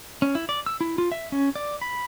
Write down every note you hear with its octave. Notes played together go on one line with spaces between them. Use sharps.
C#4
E4
D5
E6
E4
F4
E5
C#4
D5
B5